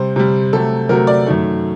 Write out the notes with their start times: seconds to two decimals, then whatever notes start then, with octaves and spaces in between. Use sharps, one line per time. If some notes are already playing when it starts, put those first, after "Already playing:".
Already playing: C3 G3 C5
0.16 C3 G3
0.53 C3 F#3 A3 A4
0.89 C3 F#3 A3 A#4
1.07 D5
1.26 F#2 D#3 A3